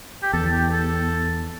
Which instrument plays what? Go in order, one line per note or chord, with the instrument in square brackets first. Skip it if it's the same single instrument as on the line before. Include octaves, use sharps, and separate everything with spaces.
[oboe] G4
[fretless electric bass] E2 [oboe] A4
[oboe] G4
A4